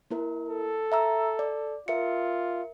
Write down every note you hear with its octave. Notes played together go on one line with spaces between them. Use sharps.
A#3 E4 A#4
A4
E5 A#5 E6
D5
F4 A#4 E5 C#7